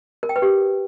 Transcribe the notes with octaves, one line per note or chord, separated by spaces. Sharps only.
A#4
G5
B4
G4